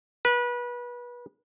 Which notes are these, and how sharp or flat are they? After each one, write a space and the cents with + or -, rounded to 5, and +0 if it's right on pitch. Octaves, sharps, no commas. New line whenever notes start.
B4 -25